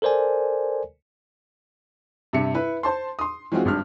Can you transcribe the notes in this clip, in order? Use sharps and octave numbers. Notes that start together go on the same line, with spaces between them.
A4 A#4 C5 D5 G#5
G2 C3 E5 C#7
E4 B4
C5 A5 C6
C6 D#6
E3 G#3 C4 F4 F#4
G#1 G2 F6